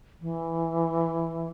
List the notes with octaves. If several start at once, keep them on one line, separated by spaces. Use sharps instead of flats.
E3